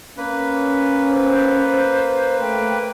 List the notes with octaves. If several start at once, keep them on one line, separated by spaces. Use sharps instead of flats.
A#3 C#4 B4
C5
A3 G5